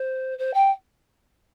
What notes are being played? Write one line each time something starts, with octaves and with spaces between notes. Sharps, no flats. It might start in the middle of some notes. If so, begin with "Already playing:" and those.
Already playing: C5
C5
G5